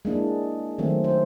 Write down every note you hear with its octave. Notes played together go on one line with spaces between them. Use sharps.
G#3 A#3 D4 E4
D#3 F#3 A3 C4
C5